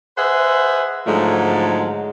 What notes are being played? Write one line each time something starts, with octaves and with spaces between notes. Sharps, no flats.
G#4 B4 C5 D#5 E5 F#5
G#2 D3 F3 F#3 G#3 A3